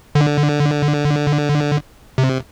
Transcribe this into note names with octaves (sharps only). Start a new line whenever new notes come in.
D3
C3